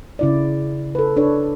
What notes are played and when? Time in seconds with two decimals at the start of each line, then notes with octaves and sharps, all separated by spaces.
0.19 C#3 E4 D5
0.95 A4 B4
1.17 D4 A4 B4 C#5